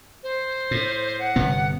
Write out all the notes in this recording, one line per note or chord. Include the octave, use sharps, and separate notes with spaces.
C5
A2
F#5
G1 C3 B3